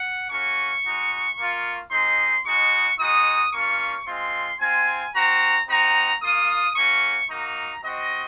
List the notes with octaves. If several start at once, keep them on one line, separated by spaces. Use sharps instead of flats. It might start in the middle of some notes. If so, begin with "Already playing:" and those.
Already playing: F#5
A#3 C#4 F#4 C#6
G#3 D#4 F#4
A#3 F4
G#3 C4 D#4 C6
G#3 D#4 F#4 C#6
G#3 D#4 F#4 D#6
A#3 C#4 F4 C#6
G#3 C4 F4 C6
C4 F4 G#5
C4 F#4 A#5
C4 D#4 F#4 A#5
A#3 F4 D#6
A#3 C#4 F#4 C#6
A#3 D#4 F#4 A#5
C4 F#4 D#5